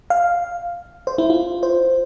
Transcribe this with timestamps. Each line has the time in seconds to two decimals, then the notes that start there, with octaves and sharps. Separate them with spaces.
0.10 F5
1.07 C5
1.18 E4
1.30 F4
1.63 C5